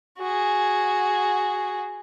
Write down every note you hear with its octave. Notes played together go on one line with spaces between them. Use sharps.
F#4 G#4